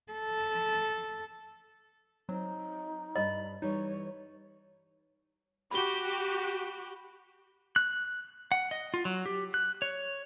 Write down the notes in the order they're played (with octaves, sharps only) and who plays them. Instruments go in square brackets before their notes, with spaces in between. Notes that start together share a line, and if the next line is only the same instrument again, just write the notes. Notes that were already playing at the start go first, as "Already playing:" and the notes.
[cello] A4
[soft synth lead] F#3 [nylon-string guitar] C4 [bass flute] D#4
[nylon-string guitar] G2 G3 D4 [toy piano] D#5 [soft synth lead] B5
[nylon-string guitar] E3 G3 [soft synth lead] D#4 [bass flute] C#5
[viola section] F#4 G4 [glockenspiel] B5 G7
[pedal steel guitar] F#6
F#5
D#5
F4
F#3
G4
F#6
C#5